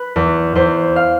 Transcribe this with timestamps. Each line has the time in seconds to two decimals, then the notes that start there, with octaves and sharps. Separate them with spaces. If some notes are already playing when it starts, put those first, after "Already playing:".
Already playing: B4
0.16 E2
0.55 E2 C5
0.96 F5